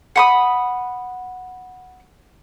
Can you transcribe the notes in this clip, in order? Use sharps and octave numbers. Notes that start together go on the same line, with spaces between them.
F#5 B5 D#6